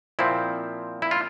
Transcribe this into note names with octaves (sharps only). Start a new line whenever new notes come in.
A#2 F3 C4 E4
E4
F4